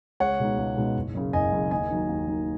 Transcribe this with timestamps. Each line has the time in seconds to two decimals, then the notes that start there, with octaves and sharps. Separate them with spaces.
0.20 C#2 C#5 F#5
0.40 B2 G#3 D#4
0.58 C#2
0.77 B2 G#3 D#4
0.96 F#1
1.15 F#2 C#3
1.33 F#1 D#5 G#5
1.52 F#2 C#3
1.71 D#2 D#5 G#5
1.91 D#3 F#3 D#4
2.09 D#2
2.27 D#3 F#3 D#4